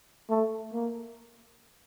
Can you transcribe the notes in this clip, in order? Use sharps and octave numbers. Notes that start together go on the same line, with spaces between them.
A3
A#3